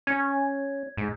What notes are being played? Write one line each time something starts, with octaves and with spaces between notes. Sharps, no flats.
C#4 G#6
G#2